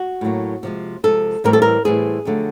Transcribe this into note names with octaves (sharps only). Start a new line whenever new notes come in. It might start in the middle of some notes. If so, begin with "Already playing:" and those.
Already playing: F#4
A2 F#3 A#3
C3 F3 G#3
C3 F3 G#3 A4
A2 E3 G3 C4 A#4
A4
A#4
A2 E3 G3 C4 G#4
F2 D3 F#3 A3